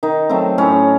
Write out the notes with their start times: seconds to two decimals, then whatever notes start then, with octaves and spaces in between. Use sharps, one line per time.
0.03 D#3 D#4
0.29 F#3 A3 C4
0.58 A2 C#4